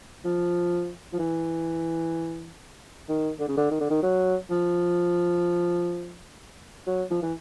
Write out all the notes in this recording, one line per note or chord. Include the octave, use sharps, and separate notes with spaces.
F3
F3
E3
D#3
D3
C#3
D3
D#3
D3
D#3
F#3
F3
F#3
F3
E3